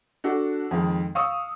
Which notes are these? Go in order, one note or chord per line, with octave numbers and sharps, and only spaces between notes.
D4 F#4 A4 F#5
F2 D#3 G#3
F5 C#6 D#6 E6